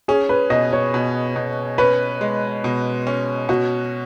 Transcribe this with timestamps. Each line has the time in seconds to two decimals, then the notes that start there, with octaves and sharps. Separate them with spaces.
0.08 C#4 G#4
0.29 B4
0.50 B2 D#5
0.73 C#5
0.94 B2
1.36 B2
1.78 C#4 B4
2.21 G#3
2.64 B2
3.07 C#4
3.49 B2 F#4